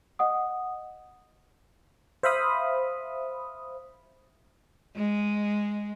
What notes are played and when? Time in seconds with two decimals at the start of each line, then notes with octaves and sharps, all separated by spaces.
0.19 D#5 F#5 D#6
2.23 C5 E5 F5 B5 D#6
4.96 G#3